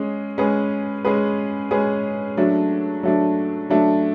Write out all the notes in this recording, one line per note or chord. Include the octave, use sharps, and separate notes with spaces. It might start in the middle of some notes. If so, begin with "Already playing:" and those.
Already playing: G#3 C#4 G#4
G#3 C#4 G#4 B4
G#3 C#4 G#4 B4
G#3 C#4 G#4 B4
F#3 A3 D4
F#3 A3 D4
F#3 A3 D4